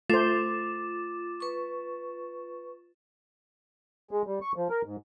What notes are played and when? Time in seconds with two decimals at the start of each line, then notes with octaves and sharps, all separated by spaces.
0.10 A3 F4 C5 D6 A6 E7
1.40 B4 C#6
4.11 G#3
4.27 G3
4.42 C#6
4.56 F3
4.70 A#4
4.85 G#2